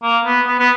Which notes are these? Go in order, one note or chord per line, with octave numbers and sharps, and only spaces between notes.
A#3
B3
B3
B3